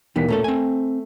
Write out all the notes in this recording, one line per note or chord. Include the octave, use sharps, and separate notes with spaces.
D#2 B2 E3 G3 B6
A#2 A3 C#4 A4
C4 G#5